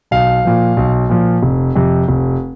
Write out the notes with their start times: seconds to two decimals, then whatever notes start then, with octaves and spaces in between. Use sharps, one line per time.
0.11 B1 F5
0.45 A#2 F3
0.77 B1
1.09 A#2 F3
1.43 F1
1.76 F2 C3
2.08 F1